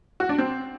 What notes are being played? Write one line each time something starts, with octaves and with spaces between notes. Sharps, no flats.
F#4
D4
C4